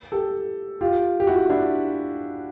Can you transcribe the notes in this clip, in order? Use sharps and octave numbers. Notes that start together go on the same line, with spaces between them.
G4 A4
F4 G4
G4
E4 F#4
D4 E4